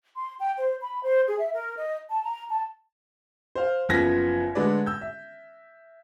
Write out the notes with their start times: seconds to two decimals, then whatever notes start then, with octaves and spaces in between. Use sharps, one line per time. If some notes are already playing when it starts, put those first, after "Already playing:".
0.16 C6
0.40 G5
0.58 C5
0.82 B5
1.02 C5
1.27 G#4
1.39 E5
1.54 A#4
1.77 D#5
2.09 A5
2.25 A#5
2.50 A5
3.55 C5 F5
3.89 F#1 F3 B3 G#6 A#6 B6
4.55 D3 G#3 A3 B4 D5
4.86 E6 G6
5.01 E5